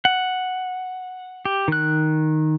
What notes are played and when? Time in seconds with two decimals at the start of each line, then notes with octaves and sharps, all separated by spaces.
0.05 F#5
1.45 G4
1.68 D#3 F#6